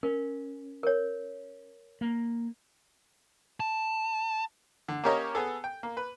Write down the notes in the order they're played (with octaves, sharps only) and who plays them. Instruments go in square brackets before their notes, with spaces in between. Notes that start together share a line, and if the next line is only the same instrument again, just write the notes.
[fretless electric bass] C#4 [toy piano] A#4
[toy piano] A#4 C#5
[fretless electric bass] A#3
[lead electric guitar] A5
[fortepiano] D3
A#3 C#4 G4 A#4 C#5 D#5
B3 G#4 A4
G5
A#3
B4